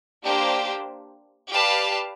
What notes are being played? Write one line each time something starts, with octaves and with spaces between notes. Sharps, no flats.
A#3 D4 G4 C5
G4 B4 D5 F5 A5